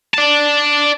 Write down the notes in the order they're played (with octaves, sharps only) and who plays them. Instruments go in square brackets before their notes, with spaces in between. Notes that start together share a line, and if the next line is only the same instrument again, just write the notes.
[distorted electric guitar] D5 A5